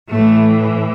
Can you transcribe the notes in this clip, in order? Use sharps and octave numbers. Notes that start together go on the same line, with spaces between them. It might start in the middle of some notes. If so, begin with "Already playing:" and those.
A2 E3 A3